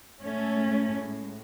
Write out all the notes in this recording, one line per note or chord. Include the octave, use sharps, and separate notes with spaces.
A2 G#3 A3 C#4